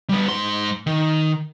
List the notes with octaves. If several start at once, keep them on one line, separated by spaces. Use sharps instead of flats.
G3 B3
G#2 C6
D#3